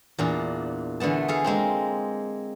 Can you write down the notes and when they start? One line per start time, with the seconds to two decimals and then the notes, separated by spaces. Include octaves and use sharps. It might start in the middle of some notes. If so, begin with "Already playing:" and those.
0.19 E2 A#2 D4
1.00 E2 D3 A3 B3 A5
1.28 G#4 A4 F5
1.44 G#3 A#3 C4